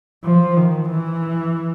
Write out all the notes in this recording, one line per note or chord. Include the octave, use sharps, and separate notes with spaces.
F3
D#3
E3